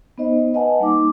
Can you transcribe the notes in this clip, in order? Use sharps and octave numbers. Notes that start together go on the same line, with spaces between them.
B3 D#4 C5 D#5
B4 D#5 F#5 G#5 A5
G3 A#3 D#4 D6